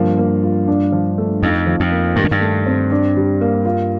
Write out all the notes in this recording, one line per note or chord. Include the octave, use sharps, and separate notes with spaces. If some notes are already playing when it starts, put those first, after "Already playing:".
Already playing: G2 F3 A#3
A#3
F4
D4
F3
A3
F2 D#4
F3
F2
A#3
G2 D#3
F2
G2
A3
C4
D4
G3
A#3
F4